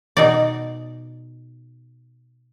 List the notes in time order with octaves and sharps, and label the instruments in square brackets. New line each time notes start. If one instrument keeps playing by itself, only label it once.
[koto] B2 D#4 D5